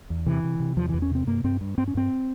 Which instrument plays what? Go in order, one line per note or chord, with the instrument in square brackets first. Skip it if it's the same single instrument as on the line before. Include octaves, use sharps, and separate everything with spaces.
[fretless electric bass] E2
C3 E3
C3
C3
E2 F3
E2 E3
C#4
C3 C4
G2 A#3
G2 C4
G2
G2 C4
C#4
G2 C4